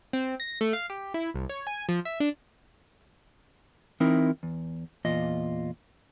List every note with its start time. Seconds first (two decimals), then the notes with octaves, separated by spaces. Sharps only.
0.13 C4
0.40 A#6
0.61 A3
0.73 F5
0.90 G4
1.14 E4
1.34 C2
1.49 C#5
1.67 G#5
1.89 F3
2.05 E5
2.20 D4
4.00 E3 C4 D#4 E4 A#4
4.43 E2
5.05 E2 A#2 F4 D#5